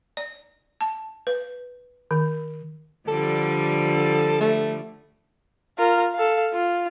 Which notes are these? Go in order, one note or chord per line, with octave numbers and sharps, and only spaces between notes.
D5
A5
B4
D#3
D3 F3 G3 A4
A3
F4 A#4
A4 F5
F4